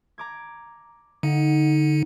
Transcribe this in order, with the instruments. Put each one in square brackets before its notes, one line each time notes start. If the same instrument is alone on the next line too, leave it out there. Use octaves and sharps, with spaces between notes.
[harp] A#5 D6 G#6
[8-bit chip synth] D3 [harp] D#4 F#5